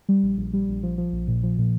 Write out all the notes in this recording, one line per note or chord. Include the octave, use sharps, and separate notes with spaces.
G3
A#1
A#1
G3
A#1
F3
F3
A#1
A#2
F3
A#2